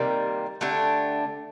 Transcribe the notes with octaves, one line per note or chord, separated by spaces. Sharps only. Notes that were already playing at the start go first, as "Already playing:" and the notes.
Already playing: C3 D#3 G3 A#3
D3 A3 D4 G4